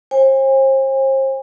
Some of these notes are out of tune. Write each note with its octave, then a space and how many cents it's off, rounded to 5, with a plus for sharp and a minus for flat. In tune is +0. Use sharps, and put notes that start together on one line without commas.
C5 +40 G#5 -40